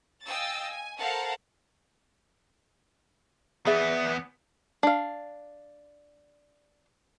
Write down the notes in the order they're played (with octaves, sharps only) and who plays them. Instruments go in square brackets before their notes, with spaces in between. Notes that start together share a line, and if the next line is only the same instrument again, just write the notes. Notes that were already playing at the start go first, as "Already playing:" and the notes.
[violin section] D#5 F5 G5 G#5 E6 A6
G#5
A4 A#4 C5 F5 F#5 A5
[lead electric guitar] E2 B3 [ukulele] G#4 D5 E5
[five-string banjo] D4 F5